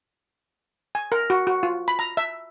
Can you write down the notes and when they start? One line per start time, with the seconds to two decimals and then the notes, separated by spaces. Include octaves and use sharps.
0.95 G#5
1.12 A#4
1.30 F#4
1.47 F#4
1.63 F4
1.88 B5
1.99 A#5
2.17 E5